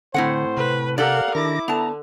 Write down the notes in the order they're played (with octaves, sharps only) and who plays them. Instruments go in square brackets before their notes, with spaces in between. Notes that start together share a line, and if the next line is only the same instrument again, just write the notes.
[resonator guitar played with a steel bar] A2 C4 F#5 [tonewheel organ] D3 [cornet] C5
[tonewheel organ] C3 [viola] B4
[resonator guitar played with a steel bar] G4 A4 D5 [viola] A#4 F#5 [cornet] F5
[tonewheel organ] D#3 D4 A#6 [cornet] E4 [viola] D6
[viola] D3 [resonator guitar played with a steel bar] B3 A5 [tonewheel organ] A#5